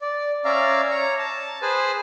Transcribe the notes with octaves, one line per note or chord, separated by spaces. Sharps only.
D5
C#4 D5 E5 F5 A#5
C#5 A#5
A5
G#4 B4 C5 G#5